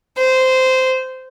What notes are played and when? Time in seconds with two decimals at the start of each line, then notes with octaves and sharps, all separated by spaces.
0.18 C5